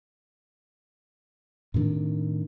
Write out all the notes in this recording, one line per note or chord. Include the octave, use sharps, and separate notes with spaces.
A2 C3 D#3 D4